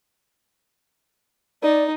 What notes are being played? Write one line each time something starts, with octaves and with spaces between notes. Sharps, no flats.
D#4 D5